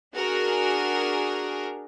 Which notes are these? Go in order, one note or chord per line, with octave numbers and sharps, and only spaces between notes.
D4 F#4 G#4 A#4